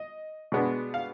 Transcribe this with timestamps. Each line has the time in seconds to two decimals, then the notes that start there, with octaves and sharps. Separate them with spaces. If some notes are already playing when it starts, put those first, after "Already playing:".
Already playing: D#5
0.52 B2 G#3 B3 D4
0.94 F5